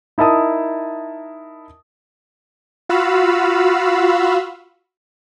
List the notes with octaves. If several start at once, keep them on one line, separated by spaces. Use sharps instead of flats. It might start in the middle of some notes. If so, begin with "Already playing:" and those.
D#4 E4 A#4 A5 D#6
F4 F#4 F5 B5 E6